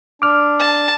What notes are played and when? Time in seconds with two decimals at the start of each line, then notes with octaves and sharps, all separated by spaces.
0.22 D4 D6 F6
0.59 A5